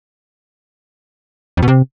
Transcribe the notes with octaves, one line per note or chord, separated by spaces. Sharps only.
F2
B2
C3